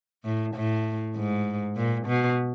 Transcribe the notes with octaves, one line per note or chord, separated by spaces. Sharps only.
A2
A2
G#2
A#2
B2